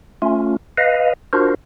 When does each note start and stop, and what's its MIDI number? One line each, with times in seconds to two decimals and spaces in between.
0.22 0.57 57
0.22 0.57 61
0.22 0.57 65
0.78 1.13 71
0.78 1.13 75
0.78 1.13 77
1.33 1.54 62
1.33 1.54 65
1.33 1.54 66
1.33 1.54 70
1.33 1.54 72